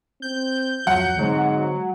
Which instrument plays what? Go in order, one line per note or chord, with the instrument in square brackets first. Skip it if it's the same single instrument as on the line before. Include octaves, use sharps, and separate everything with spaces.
[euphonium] C4 [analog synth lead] G6
[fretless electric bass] D1 F2 F3 [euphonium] F#3 [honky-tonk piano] F#5
[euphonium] G#2 [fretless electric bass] D3 G#3 C4 [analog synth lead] F#3